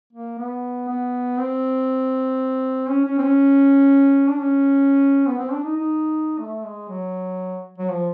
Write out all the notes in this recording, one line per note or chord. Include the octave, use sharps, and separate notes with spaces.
A#3
B3
B3
C4
C#4
C#4
C4
C#4
D4
C#4
B3
C4
D4
D#4
D#4
A3
G#3
F#3
F#3
F3